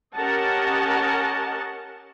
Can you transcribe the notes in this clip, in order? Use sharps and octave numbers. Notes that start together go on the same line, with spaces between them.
C#4 G4 A#4 D#5 F#5 A5